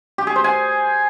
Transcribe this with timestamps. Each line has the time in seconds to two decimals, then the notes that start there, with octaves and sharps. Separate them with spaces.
0.18 G4
0.27 G#4
0.36 C5
0.44 G#5